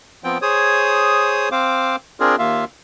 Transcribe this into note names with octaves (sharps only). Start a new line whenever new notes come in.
F3 B3 C4 G5
G#4 C5 C#5 D#6
C4 C5 F5 D6
C4 D4 F4 G#4 A#4
D#2 A#3 F4 E5 F5